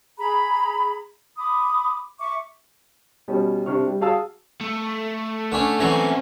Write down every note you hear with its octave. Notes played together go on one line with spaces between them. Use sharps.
G#4 A#5 B5
B5 D6 D#6
E5 C#6 D6
B2 G3 C#4
C3 D4 C5 C#6 F6
G3
F#4 G#4 F5 A5 E6
A3
D3 C#4 D4
E3 F#3 A3 C4 C#4